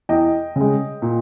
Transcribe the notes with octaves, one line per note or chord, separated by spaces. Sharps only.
E2 D#5 G5
C#3 G#3
A#2